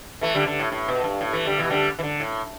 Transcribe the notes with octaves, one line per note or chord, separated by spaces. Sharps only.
E3 A3
D3 G3
D3
A2
A2
B2
G2
A2
E3 A3
D3 G3
B2 E3
D3 G3
E3
D3
A2